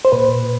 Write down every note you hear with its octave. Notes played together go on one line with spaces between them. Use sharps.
C5
A#2 B4